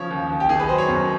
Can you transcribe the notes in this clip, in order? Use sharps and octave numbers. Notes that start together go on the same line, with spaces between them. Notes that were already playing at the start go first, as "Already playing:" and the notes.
Already playing: C#3 F3 C#5
D#2
D#2
G4
D#3 G#4
B4
F#3 C5
C#5
F#2